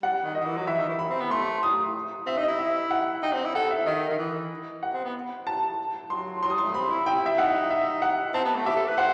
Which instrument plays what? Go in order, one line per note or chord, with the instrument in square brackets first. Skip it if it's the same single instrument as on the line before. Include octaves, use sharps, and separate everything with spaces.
[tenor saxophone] G3 [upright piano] F#5
[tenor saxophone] D#3
[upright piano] D#5
[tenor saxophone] D#3
E3
F#3
[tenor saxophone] E3 [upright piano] E5
[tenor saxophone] D#3
E3
[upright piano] B5
[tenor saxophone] C4
B3
[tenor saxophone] A3 [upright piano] C6
[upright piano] D#6
[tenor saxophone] C4 [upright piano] E5
[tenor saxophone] D#4
[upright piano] D#5
[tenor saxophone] E4
[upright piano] E5
F#5
[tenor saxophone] D#4 [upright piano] G5
[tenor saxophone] C4
E4
[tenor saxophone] A4 [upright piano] F#5
[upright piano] E5
[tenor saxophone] D#3 [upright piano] D#5
[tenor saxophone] D#3
E3
[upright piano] F#5
[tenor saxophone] C4
B3
[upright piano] A5
[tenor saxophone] F#3 [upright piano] C6
[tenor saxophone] F#3 [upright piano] C6
[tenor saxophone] G3 [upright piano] D#6
[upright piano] C6
[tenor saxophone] A3
[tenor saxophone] C4 [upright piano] B5
[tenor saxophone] E4
[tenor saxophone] E4 [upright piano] G5
[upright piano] E5
[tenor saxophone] D#4 [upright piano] F#5
[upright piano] E5
F#5
[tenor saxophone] C4 [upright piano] A5
[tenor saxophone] B3
A3
[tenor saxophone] G4 [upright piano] E5
[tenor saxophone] A4
B4
[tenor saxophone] C5 [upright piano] F#5